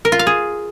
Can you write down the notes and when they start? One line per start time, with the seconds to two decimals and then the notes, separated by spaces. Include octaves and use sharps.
0.05 A#4
0.12 F4
0.19 F5
0.27 G#4